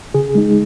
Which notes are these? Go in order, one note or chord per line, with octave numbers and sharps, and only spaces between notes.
C#3 G#4
G#3 D#4